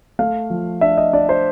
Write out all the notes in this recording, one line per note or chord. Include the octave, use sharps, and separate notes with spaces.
A3 F5
F3
D4 E5
D#5
D4 D5
C5